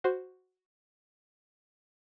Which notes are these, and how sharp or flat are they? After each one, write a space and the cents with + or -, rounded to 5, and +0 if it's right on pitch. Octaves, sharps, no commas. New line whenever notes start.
F#4 +0 C5 +0